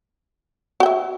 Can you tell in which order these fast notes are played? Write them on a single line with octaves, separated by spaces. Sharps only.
F#4 G5 E5